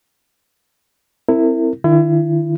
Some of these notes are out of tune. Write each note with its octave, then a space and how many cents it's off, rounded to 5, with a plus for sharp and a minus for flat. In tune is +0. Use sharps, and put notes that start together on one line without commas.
C4 +0 E4 +0 A#4 -35
D#3 -25 E4 +35